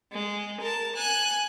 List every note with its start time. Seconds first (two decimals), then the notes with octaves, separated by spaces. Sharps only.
0.12 G#3
0.60 A#4 A5
0.95 G#5 F#6